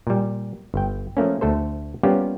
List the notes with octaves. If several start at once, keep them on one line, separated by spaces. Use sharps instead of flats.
A#2 G3
G1 G5
F3 A3 A#3 C#4
D2 A3 A4 C5
G3 A#3 B3 C#4 F4 G4